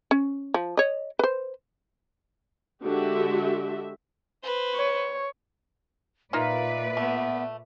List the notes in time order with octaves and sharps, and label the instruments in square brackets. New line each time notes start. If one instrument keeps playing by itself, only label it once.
[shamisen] C#4
F3
C#5 D#5
B4 C5
[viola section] D3 G#3 F#4 G4 E5
[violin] B4 C5
[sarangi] C#5
[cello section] A#2 B4 D5 [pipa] A#3 D#4 F4 [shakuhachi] E5
[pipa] A3 [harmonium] B3